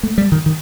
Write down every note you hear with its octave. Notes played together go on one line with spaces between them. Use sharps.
A3
G3
D#3
D#3